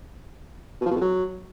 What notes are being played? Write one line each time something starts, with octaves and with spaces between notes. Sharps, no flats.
B2
F3
B2
F2
F#3